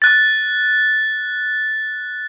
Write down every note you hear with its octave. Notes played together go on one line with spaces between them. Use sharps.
F#6 A6